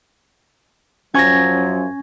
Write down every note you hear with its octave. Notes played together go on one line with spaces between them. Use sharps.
F#2 F3 F#3 C#4 G#5 C#6 G#6 A#6